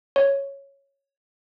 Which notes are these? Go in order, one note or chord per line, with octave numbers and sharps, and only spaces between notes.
C#5